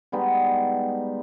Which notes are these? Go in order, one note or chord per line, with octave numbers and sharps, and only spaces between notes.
G3 G#3 B3 D#4